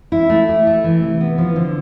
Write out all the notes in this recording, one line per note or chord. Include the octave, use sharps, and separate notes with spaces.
E4
A3
G4
A3
E3
C3
B3
F3
D3